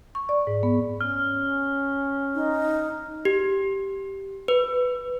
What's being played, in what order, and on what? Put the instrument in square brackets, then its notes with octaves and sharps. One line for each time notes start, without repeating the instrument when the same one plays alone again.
[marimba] C#6
D5
G#2
B3
[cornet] C#4 [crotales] F6
[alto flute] D#4
[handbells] G4
B4